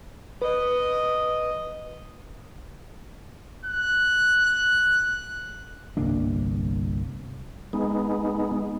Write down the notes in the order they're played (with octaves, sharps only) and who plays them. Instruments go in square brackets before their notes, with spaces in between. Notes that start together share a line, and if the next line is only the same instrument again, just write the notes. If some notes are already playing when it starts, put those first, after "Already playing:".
[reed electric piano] B4 [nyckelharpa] D#5
[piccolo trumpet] F#6
F#6
[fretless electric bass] G1 C2 A#3 D4
[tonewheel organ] G#3 B3 D#4